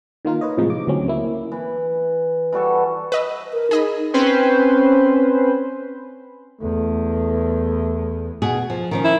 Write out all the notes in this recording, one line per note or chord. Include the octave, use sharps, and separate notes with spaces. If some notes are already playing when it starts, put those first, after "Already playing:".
D#3 A#3 F4 A#4
B4 C#5 D#5
A2 C3 E3 F3 G#3 D#4
D6
D2 F#3 C4 C#4
A#3 E4
E3
E3 G3 F#4 A4
B4 D#5 E6
A#4
D#4 G#4 D#5 B5
C4 C#4 B4 C5
E2 A3
B2 F#4 G#4
F3
D#3 F3 C#4
E4